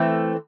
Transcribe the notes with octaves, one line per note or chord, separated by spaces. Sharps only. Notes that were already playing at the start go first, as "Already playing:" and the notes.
Already playing: E3 A3 C4